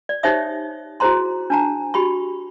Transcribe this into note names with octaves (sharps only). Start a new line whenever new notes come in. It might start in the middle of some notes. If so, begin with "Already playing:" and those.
D5
D#4 G4 C5 C#5 E5 D#6
E4 F#4 G#4 C5 A#5 C6
D4 A5 A#5
F#4 G4 B5 C#6